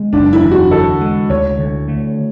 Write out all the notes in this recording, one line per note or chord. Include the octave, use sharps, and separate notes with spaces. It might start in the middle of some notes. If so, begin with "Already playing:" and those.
Already playing: D3 G#3
F#1 D4
E4
E2
F#4
D3 A4
G#3
D2 C#5
D3
A3